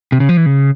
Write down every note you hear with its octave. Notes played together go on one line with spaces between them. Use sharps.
C3
C#3
F3
E3
C#3